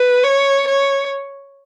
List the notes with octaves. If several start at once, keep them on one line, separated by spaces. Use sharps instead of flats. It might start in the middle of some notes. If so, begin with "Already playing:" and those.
Already playing: B4
C#5
C#5